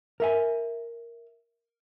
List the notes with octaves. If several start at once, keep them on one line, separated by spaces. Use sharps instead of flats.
A#4 E5 G#5